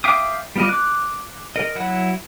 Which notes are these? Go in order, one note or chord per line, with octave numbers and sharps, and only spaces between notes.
E5 F5 G5 D6 D#6
G3 B3 F4 D5 D#5
D6 F#6
A#4 D#5
F#3 E4 F#5